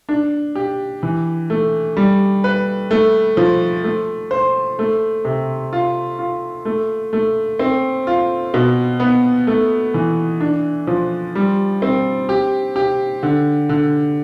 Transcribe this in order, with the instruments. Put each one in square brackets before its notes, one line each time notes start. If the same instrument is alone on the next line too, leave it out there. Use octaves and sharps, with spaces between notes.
[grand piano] D4
G4
E3
A3
G3
B4
A3
F3
A3
C5
A3
C3
F4
F4
A3
A3
C4
F4
B2
B3
A3
E3
D4
F3
G3
C4
G4
G4
D3
D3